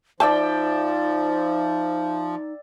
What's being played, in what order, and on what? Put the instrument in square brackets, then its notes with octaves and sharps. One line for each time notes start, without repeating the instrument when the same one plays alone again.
[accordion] F3 [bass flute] D#4 [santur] D5 E5 G5 [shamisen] A5